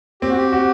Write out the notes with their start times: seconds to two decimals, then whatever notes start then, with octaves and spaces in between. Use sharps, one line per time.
0.22 C4 G4
0.29 F#4
0.37 G4
0.52 F#4